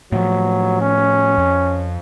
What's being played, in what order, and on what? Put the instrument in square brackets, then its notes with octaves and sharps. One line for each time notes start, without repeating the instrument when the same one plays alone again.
[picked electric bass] A2 F3 [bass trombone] F#3
[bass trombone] C#4
[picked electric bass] F2